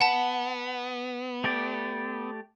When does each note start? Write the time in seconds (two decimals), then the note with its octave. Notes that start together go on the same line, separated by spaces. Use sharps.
0.01 B3 F#5 A5
1.44 A3 G4 D5